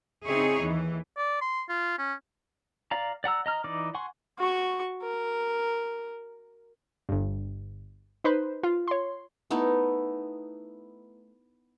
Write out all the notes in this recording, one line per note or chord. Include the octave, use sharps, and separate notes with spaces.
C#3 C4 D#4 E4 G#4 C#5
D#2 E3
D5
C6
F4
C#4
D5 F5 A#5
D5 F#5 A#5 E6
D#5 A#5 F6
E3 D#4 D5 D6
F#5 G#5 C6 C#6
F#4 C#6
A#4
G1 G2
D#4 B4 C5
F4
C#5 C6
A3 B3 D#4 E4